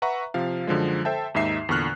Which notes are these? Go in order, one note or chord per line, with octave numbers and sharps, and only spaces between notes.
B4 E5 F#5 A#5 C#6
C3 F3 F5
F#2 D3 F3 G#3
A4 C5 E5 G5 A5
D#2 G#2 D#4 E5 C7 E7
E2 A#2 D3 C#6 F6 F#6